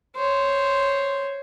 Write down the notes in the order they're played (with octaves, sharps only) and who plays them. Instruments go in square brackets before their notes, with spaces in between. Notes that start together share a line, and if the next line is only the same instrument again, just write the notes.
[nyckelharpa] C5 C#5